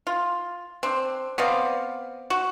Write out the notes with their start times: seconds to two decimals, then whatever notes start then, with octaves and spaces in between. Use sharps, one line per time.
0.07 F4
0.83 C4 D4
1.38 B3 C4 D5 F5
2.30 F#4